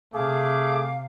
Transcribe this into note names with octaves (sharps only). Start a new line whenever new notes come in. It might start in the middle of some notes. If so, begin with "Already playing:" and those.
C3 A3 G#4 F5 D6